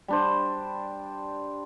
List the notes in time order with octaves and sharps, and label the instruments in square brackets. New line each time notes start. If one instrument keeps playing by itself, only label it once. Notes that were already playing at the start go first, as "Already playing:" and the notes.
[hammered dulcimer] G3 D4 C5